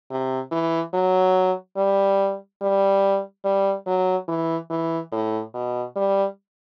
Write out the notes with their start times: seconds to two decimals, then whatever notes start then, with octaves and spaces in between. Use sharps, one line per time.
0.11 C3
0.51 E3
0.94 F#3
1.77 G3
2.61 G3
3.44 G3
3.87 F#3
4.28 E3
4.70 E3
5.12 A2
5.54 B2
5.96 G3